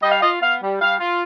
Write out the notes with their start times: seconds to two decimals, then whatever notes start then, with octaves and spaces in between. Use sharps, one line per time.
0.03 G3 D#5
0.12 F5
0.21 F4 D#5
0.42 B3 F5
0.62 G3
0.80 G3 F5
1.00 F4